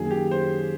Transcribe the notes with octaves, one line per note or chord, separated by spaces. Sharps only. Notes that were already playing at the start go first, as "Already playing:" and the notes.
Already playing: F#2 D#3 F#3 A#3 G#4
G4
C5